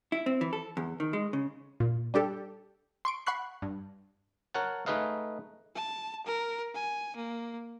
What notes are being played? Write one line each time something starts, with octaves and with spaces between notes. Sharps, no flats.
E4
C4
E3
A4
E2
D#3
G#3
C#3
A#2
G3 D4 G4 A4
C6 C#6 D7
F#5 B5 C#6 F#6 C7
G2
A#4 C#5 F#5 A5
A3 D#4 G#4 B4 D#5 F5
A5
A#4
G#5
A#3